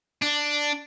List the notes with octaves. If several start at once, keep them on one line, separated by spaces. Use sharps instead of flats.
D4